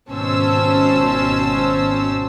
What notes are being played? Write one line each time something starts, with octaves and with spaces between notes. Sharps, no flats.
G#1 B2 C#4 C5 A5 E6